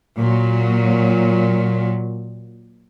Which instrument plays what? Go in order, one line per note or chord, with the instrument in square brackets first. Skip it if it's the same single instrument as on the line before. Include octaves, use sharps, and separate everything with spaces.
[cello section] A#2 F#3